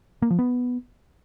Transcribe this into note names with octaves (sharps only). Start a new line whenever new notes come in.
A#3
F3
B3